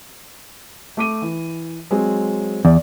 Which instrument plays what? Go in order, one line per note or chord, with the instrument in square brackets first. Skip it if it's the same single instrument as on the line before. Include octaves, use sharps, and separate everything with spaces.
[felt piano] A3 D6 D#7
E3
F#3 G#3 C4
[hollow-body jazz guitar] E2 [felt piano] D5